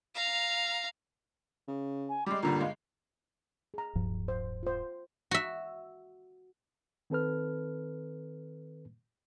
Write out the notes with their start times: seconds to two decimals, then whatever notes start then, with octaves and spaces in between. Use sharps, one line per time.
0.15 F5 A#5
1.68 C#3
2.09 G#5
2.26 G3 G#3 D6
2.43 G1 A#2 D3 G3 A#5
2.61 G#3 F5
3.74 G#4 A#5
3.95 D1 G2 F3
4.28 C5
4.63 F4 C5
5.31 F#4 E5
7.10 D#3 C4 A4 B4 F6